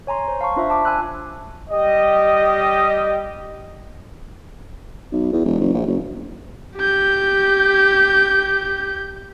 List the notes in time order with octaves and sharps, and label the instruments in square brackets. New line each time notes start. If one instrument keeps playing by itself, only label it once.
[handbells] C#5 G#5 A#5 C6
C5
F5 A5 C6 C#6
D4 F4 C5 E5
A5 D6
G#5 B5 E6 F#6
[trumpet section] G3 G4 D#5
[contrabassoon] B1
E2
E1
F#1
A#1
F#1
[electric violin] G4 G6